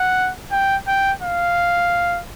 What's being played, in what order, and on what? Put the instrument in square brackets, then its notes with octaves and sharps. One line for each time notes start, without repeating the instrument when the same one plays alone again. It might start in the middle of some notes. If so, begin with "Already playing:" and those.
Already playing: [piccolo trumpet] F#5
G5
G5
F5